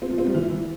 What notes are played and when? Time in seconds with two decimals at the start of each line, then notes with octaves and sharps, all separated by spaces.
0.02 C4
0.10 F3
0.18 C4
0.26 G3
0.35 E3